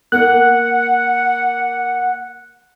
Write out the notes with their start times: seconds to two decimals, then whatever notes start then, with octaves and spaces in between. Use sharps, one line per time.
0.12 A#3 F#5 F#6